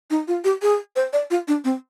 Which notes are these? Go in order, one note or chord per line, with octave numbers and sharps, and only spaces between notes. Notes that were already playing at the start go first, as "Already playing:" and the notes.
D#4
F4
G4
G#4
C5
D5
F4
D4
C4